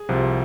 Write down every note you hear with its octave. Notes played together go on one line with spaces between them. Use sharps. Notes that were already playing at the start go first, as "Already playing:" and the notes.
Already playing: G#4
C2 C3 F3